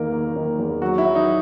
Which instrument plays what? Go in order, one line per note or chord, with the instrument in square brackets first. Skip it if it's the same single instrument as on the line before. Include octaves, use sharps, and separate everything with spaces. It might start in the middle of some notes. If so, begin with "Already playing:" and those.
Already playing: [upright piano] E2 D#3 A#3 [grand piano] A#4
[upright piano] A#3
D#3
E2
[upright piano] F#3 [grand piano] F#4
[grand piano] E4
[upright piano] F#3
[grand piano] D#4